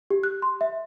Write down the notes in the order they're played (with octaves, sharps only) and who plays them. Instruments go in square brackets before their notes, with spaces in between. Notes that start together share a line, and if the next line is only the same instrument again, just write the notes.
[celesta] G4
F#6
C6
E5